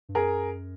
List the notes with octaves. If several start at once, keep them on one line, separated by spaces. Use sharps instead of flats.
G2
F#2 G#4 A#4